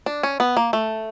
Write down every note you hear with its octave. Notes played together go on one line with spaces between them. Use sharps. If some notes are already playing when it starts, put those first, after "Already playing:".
D4
C#4
B3
A#3
A3